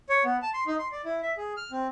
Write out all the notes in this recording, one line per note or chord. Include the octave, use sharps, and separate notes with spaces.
C#5
B3
A5
C6
D#4
C6
D5
E4
E5
G#4
F6
C4